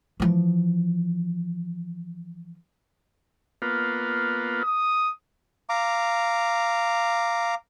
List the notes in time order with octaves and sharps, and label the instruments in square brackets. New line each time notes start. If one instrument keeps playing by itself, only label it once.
[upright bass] E3 F3
[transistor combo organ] A#3 B3 F4
[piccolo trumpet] D#6
[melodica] F5 A#5 D6